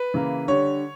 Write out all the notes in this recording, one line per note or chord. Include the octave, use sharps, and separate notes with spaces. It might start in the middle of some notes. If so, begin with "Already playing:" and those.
Already playing: B4
C#3 E3 A#3
D3 G3 C#5